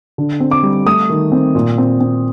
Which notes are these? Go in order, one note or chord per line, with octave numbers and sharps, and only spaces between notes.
D3
C4
D6
G3
A3 D#6
D#3
C4
A#2
C4
C4